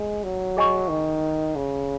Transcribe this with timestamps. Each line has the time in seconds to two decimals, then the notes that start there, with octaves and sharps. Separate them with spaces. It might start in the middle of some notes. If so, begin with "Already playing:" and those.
Already playing: G#3
0.23 F#3
0.57 G#4 D#5 G#5 C#6
0.90 D#3
1.56 C#3